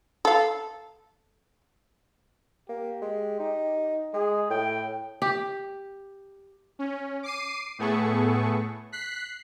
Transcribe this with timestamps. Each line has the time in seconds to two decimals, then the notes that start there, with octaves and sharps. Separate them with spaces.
0.25 A4 F5
2.69 A#3 G4
3.02 G#3
3.40 D#4
4.14 G#3 G#4
4.50 A2 G5
5.22 G4
6.79 C#4
7.23 D6 C7 D#7
7.79 A2 A3 B3 G#4 A4 C#6
8.92 F#6 B6 C7